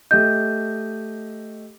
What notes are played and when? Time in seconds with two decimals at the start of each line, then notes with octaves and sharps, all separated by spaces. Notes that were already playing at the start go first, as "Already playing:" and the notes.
0.11 A3 G4 D#5 G6